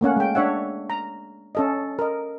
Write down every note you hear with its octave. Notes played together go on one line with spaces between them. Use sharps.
A3 A#3 C#4 F#5
G#3 G5
D4 C#5 E5 F#5
A#5
C#4 A4 D#5
A#4 D#5